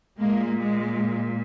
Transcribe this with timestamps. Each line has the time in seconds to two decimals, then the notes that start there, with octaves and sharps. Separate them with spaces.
0.19 A#2 G#3 A#3
0.59 G#3